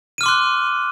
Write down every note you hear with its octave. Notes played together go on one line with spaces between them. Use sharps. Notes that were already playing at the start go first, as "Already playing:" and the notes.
C6 D6 F6 F#6 D#7